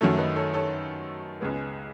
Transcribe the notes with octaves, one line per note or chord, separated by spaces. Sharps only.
F#2 D#3 F#3 A3 A4 C#5
B4 D#5
A4 C#5
A4 C#5
C#2 C#3 G#3 B3